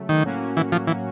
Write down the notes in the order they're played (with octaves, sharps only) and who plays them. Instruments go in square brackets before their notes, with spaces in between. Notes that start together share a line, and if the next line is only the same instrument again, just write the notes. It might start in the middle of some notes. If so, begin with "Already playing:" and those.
Already playing: [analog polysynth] C#3 F#3 A3
[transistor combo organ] D#3
[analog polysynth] A2 F#3 A#3 C#4 F#4
[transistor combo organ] E3
F3
E3